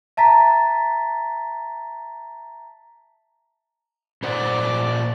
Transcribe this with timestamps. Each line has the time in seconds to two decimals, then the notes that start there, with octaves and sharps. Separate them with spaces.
0.17 E5 A5 A#5 A6 B6
4.23 A#2 C5 D5 F#5